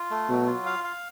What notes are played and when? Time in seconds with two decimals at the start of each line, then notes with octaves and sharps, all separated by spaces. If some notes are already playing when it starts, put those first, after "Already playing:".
Already playing: F4
0.11 A3
0.29 B2 F#3
0.47 F4
0.66 F5
0.84 F5